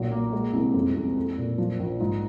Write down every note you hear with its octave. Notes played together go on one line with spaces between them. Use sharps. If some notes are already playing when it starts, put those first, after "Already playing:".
Already playing: B1 A#2
A#3
G#3
C2
F2
F2
A3
A#2
F3
A#1
G#2